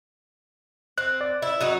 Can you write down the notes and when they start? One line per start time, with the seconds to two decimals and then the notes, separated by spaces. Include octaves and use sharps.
0.98 C4 F#6
1.21 D5
1.42 E4
1.61 F#3 D#4 F#4